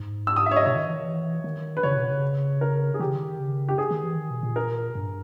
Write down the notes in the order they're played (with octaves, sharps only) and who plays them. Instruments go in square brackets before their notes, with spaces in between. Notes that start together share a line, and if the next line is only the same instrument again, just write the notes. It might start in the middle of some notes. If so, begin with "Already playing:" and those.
Already playing: [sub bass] G#2
[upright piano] E6
D#6
E5
C#5
D#5
[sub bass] B2 [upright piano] C#5
[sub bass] D#3
E3
D#3
E3
D#3
[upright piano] B4
[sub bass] C#3 [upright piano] C#5
[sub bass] B2
C#3
[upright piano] A#4
G#4
[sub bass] D#3 [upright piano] G4
[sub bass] C#3
D#3
C#3
[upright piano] G4
G#4
[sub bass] D#3
E3
D#3
B2
A#2
[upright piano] A#4
[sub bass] G2